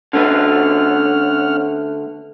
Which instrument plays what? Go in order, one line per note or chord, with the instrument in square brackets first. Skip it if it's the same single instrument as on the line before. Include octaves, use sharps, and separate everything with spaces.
[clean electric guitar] D3 A3 B4 [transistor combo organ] C#4 F#5 F6